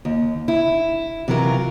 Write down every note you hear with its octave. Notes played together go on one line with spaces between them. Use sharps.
D#2
E4
C3 E3 F#3 F4 A#4